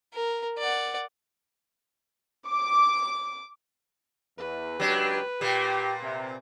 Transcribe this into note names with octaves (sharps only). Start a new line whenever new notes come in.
A#4
D5 F#5
D6
E2 B4
C#2 F#3 D4 G4
A#2 A#3 G4
C3